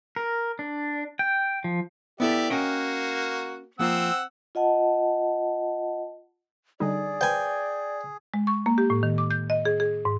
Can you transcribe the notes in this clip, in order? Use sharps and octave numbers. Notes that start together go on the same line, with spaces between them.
A#4
D4
G5
F3
B3 E4 G4 A4 D5 E5
A#3 C#4 F#4 D#5 G5
F3 A#3 C4 F4 F#5 E6
F4 D#5 F#5 A5
D3 G3 D#4 G#4 D5
B4 C5 G5 G#5
G#3
C#6
A#3
G4
A2
D#3
D6
G6
D#5
G#4
G#4
G#2